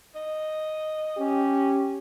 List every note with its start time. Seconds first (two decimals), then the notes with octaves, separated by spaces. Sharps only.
0.15 D#5
1.17 C#4 G4